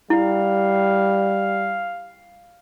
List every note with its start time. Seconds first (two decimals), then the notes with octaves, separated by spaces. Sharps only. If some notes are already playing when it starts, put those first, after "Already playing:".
0.10 G3 E4 F5